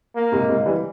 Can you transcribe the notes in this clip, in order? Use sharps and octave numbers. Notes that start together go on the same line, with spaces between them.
A#3
G#2 C3
G#2 C3
E3 G3